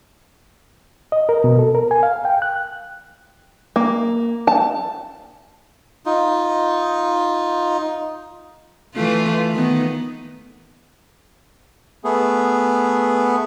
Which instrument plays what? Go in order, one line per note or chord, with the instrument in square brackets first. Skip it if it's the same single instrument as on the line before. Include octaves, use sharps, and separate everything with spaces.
[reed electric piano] D#5
A#4
B2
A4
A#4
G#5
F5
G5
F#6
[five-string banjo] A#3
A5
[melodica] D#4 F4
[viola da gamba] E3 A3 F4
D#3 B3
[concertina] A3 B3 G#4